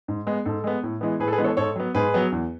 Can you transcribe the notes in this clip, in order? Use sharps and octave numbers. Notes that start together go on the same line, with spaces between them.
G#2
G#3 B3
G#2 A4
G#3 B3
A2
E3 G#3 B3
A2 G#4 B4
A4
G#4 B4
E3 G#3 B3
A4 C#5
G#2 A4 C#5
F#3 B3
G#2 G#4 B4
F#3 B3
E2